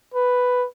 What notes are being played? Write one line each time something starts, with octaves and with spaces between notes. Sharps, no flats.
B4